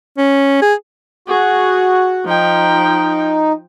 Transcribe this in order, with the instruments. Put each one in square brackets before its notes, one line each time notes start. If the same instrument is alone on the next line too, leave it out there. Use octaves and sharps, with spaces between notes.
[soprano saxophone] C#4
G#4
[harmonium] F#4 [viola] G#4
[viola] F3 G5 [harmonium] D#4